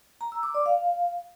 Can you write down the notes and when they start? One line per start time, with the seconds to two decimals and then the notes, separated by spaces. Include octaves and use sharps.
0.21 A#5
0.32 E6
0.43 D6
0.54 D5
0.66 F5